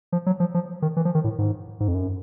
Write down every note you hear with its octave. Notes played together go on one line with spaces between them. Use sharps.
F3
F#3
F3
F3
D#3
E3
F3
D#3
A2
G#2
G#2
F2
F#2